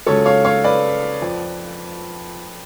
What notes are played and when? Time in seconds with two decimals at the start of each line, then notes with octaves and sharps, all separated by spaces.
0.06 C#2 C#3 F#3 A4 C#5
0.26 C#5 F5
0.44 C#5 F5
0.64 B4 D5
1.22 F2 F3